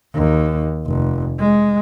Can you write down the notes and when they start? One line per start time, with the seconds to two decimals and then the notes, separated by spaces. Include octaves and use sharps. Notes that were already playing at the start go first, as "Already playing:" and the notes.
0.14 D#2
0.87 F1
1.39 G#3